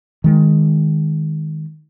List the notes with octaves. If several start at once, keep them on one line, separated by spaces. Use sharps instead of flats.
D#3 G#3